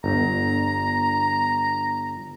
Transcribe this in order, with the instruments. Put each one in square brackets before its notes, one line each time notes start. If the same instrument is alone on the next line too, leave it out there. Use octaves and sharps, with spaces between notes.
[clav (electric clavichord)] G1 [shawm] A#5